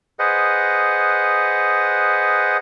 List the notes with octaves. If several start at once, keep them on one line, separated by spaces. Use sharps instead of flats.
G#4 B4 C5 D#5 F#5